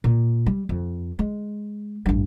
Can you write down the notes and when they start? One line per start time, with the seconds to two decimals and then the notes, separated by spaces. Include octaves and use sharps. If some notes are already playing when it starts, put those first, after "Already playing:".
0.04 A#2
0.46 G3
0.69 F2
1.19 G#3
2.06 A1 G2